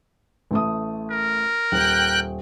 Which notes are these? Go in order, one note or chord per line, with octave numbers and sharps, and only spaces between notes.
A1 A3 D#6
A#4
D#1 G5 F#6